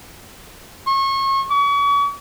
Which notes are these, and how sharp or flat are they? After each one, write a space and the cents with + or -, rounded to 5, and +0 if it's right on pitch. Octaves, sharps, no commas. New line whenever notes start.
C#6 -35
C#6 +40